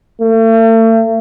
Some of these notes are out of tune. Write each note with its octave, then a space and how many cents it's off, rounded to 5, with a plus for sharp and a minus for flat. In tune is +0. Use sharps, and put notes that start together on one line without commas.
A3 +40